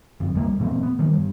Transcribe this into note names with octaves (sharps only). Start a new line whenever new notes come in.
G1 F2
C2 G3 A#3
A#2 E3 A#3 C4
B3
D#3 G3
G2